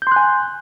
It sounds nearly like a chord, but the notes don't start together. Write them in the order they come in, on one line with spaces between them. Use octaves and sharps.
G6 C6 F#6 G#5